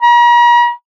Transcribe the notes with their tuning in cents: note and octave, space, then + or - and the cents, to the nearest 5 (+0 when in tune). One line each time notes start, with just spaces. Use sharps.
A#5 +45